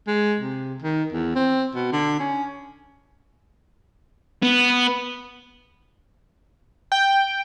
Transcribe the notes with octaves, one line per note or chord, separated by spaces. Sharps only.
G#3
C3
D#3
E2
C4
B2
D3
C#4
B3
G5